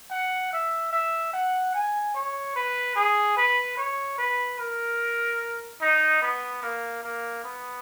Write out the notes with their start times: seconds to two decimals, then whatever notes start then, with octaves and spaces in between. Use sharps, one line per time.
0.11 F#5
0.53 E5
0.93 E5
1.33 F#5
1.74 G#5
2.14 C#5
2.56 B4
2.96 G#4
3.37 B4
3.77 C#5
4.18 B4
4.59 A#4
5.81 D#4
6.22 B3
6.63 A#3
7.03 A#3
7.44 B3